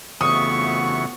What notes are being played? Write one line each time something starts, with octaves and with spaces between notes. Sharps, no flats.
F2 C#3 E3 A3 B3 F#4 C#6 D#6